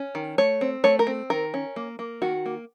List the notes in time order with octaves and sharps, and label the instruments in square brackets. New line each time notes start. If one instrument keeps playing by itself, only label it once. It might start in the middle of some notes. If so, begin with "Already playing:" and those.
Already playing: [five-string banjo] C#4
D#3
A3 C#5
C4
A3 C#5
A#4
C4
D#3 A#4
C#4
A#3
A#3
D#3 F#4
A#3